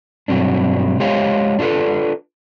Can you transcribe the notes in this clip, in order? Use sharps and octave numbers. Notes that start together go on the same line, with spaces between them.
G2 B2 F#3 C4 D4
G#3 G4 C5 C#5 D#5 F5
D4 F4 F#4 A4 B4